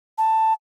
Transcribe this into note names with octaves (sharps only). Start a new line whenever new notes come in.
A5